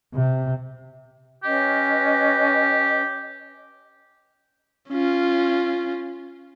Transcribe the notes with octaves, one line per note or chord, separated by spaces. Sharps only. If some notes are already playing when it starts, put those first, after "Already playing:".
C3
C#4 G4 B4 D#5
C#4 F4